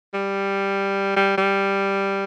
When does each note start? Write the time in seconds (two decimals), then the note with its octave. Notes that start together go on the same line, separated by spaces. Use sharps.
0.14 G3
1.16 G3
1.37 G3